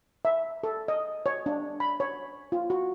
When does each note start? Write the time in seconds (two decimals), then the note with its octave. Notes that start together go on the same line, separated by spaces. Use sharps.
0.25 E5
0.63 A4
0.88 D#5
1.26 C#5
1.46 D4
1.80 B5
2.00 C#5
2.52 F4
2.70 F#4